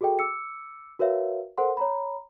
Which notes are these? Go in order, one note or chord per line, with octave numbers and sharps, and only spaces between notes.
F#4 G#4 A4 D#5 G5
D6 E6 C#7
F#4 A#4 B4 C#5 E5 F5
A4 A#4 C5 F#5 C6
C#5 A#5 B5